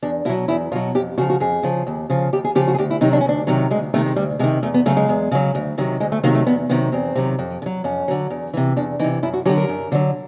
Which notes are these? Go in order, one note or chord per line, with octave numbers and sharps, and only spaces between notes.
E2 D4
B2 F#3 E4
E2 E4
B2 F#3 F4
F2 G4
C#3 F3 F#4
F#4
F2 G#4
C#3 F3
D#2
C#3 F3
D#2 G4
G#4
C#3 F3 G4
F#4
G#4
D2 G4
E4
C3 D#3 F#3 D#4
D4
C#4
D2 D4
C3 D#3 F#3
D2 G#3
C3 D#3 A3
G#3
D2 G3
C3 D#3 G#3
E2 A3
B3
C#3 F#3 A3
G#3
E2
C#3 F#3
D2
C3 D#3 F#3
D2 G#3
A3
C3 D#3 F#3 A#3
A3
E2 B3
C3 D#3 F#3 B3
E2 C4
C3 D#3 F#3
F2
D3
F#3
F2 C#4
D3 F#3
E2
C3 E3
E2 D4
C3 E3 D#4
F#2 E4
F#4
D3 F#3 G4
A#4
F#2
D3 F#3